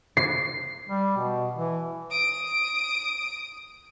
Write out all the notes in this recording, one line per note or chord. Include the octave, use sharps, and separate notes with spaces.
C7
G3
B2
E3
D#6 D7